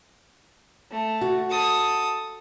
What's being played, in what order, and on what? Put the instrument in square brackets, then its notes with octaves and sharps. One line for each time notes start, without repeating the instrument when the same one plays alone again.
[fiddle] A3
[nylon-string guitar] F#4
[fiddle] A4 D#6